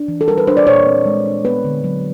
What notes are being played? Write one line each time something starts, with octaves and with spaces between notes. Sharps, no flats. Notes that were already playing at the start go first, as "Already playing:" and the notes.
Already playing: D4
E3
A4
G3 A#4
B4
D4 C5
D5
A#2 C#5
C4
G#3
D4
B3 B4
D3
F#3